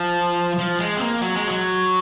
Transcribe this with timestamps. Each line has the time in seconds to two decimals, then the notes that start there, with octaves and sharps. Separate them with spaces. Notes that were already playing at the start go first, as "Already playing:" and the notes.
Already playing: F3
0.59 F3
0.79 G#3
0.97 C4
1.01 A#3
1.22 F#3
1.35 G#3
1.47 F#3